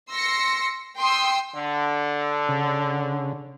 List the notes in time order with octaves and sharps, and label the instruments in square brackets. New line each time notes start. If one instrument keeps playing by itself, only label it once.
[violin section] C6 E6 A#6 C#7
G5 C6 D#6 E6
[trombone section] D3
[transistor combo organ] C#3